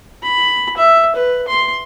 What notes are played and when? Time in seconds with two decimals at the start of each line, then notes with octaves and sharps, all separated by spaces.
0.23 B5
0.77 E5
1.16 B4
1.48 C6